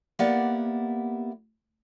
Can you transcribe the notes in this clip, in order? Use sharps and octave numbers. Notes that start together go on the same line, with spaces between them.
A#3 B3 E4 G4 D5 F#5